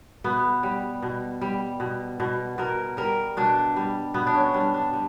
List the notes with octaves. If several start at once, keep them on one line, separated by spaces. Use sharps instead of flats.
B2 B3
G3
B2
G3
B2
B2
B2 A#4
G3 A#4
B2 D4
G3
B2 B3
D4
C#4
G3 D4
D4
G3